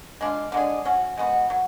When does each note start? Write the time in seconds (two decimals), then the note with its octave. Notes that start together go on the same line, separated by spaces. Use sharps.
0.21 G#3 D4 F4
0.52 D3 G#3 D4 G#4
0.85 F#3 C#4 F#4
1.17 G#3 B3 F#4
1.50 F#3